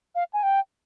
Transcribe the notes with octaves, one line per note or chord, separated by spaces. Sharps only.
F5
G#5
G5